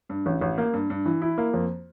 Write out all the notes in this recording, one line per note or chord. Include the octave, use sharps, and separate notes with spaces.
G2
A1
A1
A#3
G2
G2
E3
E4
A#3
F2